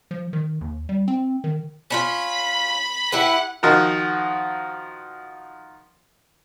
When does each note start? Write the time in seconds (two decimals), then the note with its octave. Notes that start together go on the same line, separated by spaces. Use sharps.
0.11 F3
0.33 D#3
0.61 D#2
0.89 G3
1.08 C4
1.44 D#3
1.90 C#4 D#4 F4 B5
3.12 E4 G4 B4 F#5
3.63 D#3 F3 D#4 F#4 A#4